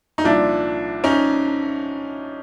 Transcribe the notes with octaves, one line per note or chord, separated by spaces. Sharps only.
D#4
C2 A#2 F3 D4 E4
C#4 D#4